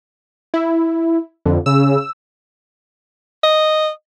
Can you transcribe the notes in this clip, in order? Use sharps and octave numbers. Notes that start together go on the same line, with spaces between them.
E4
F2 D3
C#3 E6
D#5